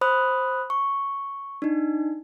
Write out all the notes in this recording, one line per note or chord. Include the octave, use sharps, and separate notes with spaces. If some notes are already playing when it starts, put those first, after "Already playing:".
C5 B5 D#6 F#6
C#6
D4 D#4